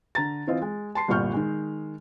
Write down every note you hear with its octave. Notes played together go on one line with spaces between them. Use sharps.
D3 A#5 A6
E3 C4 F4 D#5
G#3
A5 C6 C7
G1 C2 A#2 C#6 F6 G6
D#3 G#3